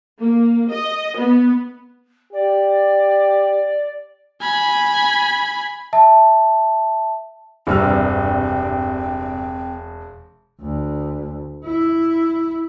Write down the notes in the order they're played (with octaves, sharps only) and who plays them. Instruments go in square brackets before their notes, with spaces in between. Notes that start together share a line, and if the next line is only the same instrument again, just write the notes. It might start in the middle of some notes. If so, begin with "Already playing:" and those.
[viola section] A#3
D#5
B3
[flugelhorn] G4 [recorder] D5
[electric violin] G#5 B5
[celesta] E5 A5
[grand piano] E1 E6 F6 [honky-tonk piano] G2 C3 [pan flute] C4
[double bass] D2
E4